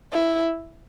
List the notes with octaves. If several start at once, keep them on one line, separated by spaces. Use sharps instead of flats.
E4